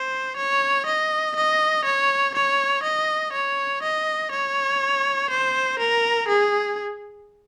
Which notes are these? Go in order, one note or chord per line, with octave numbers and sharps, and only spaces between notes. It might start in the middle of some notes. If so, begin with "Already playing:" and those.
Already playing: C5
C#5
D#5
D#5
C#5
C#5
D#5
C#5
D#5
C#5
C5
A#4
G#4